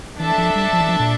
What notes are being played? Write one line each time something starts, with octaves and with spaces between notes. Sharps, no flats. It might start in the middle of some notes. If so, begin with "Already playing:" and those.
E3 D4 A4 E5 A5
F3
G3
F3
E3
F3
A#2